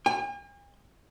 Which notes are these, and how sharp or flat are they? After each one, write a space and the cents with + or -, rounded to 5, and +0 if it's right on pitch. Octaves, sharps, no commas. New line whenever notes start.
G#5 -45